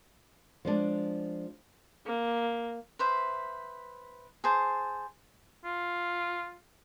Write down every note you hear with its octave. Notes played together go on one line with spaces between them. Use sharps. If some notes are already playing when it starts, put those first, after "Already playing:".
F3 G#3 D4
A#3
B4 C5 E5
G#4 C5 A5
F4